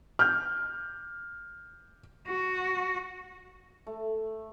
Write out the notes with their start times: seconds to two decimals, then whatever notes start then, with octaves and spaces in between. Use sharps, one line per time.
0.19 F6 G6
2.28 F#4
3.87 A3